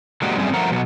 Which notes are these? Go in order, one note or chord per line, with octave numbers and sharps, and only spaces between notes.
F#3 G#3 A#3 D4 F#4 G4
F#2 G3 A3 C4 G#4
G2 F3 A3 A#4 F#5 A#5
B2 F#3